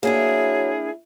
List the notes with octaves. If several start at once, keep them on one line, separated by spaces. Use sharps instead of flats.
F#3 A#3 D4 E4 G#4